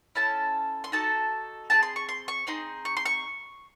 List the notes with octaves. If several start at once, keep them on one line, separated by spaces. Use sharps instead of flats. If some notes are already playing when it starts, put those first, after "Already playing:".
C#4 E4 A4 A5
C6
D#4 F#4 A4 A5
C4 E4 G#4 A5
C6
C#6
C6
C#6
C4 D#4 G#4 C6
C#6
C6
C#6